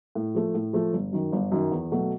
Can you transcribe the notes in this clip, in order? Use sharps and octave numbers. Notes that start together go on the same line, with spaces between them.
A2
F3 A3
A2
F3 A3
G1
F#2 D#3
G1
F#2 D#3
E2
B2 F#3 A3